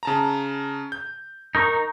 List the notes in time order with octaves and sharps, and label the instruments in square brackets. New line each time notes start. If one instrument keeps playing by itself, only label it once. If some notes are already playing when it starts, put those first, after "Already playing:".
[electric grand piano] C#3 A5 A#5
G6
[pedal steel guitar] D#4 A#4 C#6